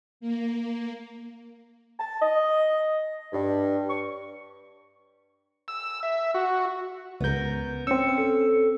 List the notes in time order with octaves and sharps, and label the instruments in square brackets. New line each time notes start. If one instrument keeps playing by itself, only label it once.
[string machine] A#3
[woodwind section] A5
D#5
G2
C#6
[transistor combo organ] E6
E5
F#4
[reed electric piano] C#2 G6 [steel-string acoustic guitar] B3 A#4
[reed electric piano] C4 E6 [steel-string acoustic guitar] C#4 [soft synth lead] C#7
[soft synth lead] A4